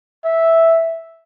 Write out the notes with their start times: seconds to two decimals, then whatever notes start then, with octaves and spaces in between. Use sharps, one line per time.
0.25 E5